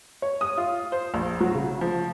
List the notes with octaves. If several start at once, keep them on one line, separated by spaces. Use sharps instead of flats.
C#5
D#6
F4
C5
A#1
F#3
C#3
F3